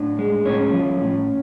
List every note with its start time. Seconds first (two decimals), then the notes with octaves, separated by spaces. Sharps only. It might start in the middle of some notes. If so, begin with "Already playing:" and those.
Already playing: A2 D4
0.19 G#3
0.46 A2 C#4 C#5
0.73 F3
1.01 A2